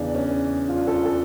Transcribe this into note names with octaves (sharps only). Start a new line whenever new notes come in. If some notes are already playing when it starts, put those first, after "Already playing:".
Already playing: E2 C#3 E3 D4
C#4
D4 F4
F4 A4
F4 A4